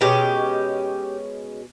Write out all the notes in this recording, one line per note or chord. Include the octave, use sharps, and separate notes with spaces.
B2 G#3 C#4 G4